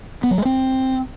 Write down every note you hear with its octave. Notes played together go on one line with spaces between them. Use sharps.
B3
F#3
G#3
C4